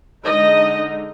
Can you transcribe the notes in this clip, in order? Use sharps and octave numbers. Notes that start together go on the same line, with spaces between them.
D3 G#3 D#4 D#5